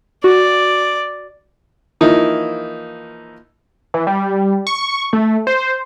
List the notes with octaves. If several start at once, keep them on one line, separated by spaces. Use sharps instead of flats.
F#4 D5
E3 F3 A#3 D#4 E4
E3
G3
C#6
A3
C5